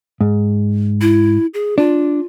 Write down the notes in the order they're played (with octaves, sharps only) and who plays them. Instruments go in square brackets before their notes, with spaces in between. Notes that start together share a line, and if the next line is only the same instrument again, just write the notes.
[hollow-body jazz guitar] G#2
[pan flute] E4
G#4
[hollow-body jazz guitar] D4 [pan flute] F4